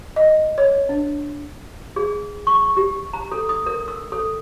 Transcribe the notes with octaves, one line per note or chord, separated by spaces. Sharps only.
D#5
C#5
D4
G#4
C#6
G4
A#5
A4
D#6
A#4
E6
A4